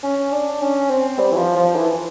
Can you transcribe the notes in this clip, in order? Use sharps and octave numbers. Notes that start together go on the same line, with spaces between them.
C#4
D4
C#4
C4
G3
E3
F3
F3
E3